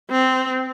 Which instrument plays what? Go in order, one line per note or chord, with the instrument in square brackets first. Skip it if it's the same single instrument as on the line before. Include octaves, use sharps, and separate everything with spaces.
[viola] C4